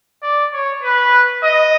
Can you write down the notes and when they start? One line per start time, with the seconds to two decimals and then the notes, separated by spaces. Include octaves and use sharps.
0.23 D5
0.53 C#5
0.83 B4
1.43 D#5